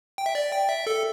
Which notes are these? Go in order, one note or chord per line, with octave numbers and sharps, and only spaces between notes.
G5
E5
D5
G5
E5
A4